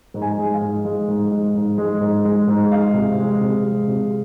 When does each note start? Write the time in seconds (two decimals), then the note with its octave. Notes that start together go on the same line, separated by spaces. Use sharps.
0.14 G#2
0.22 G#5
0.38 G#3
0.53 F5
0.61 G#2
0.85 G#3
1.08 G#2
1.31 G#3
1.55 G#2
1.78 G#3
2.01 G#2
2.25 G#3
2.48 G#2
2.71 G#3 F5
2.94 C3
3.18 G#3
3.41 C3
3.64 G#3
3.88 C3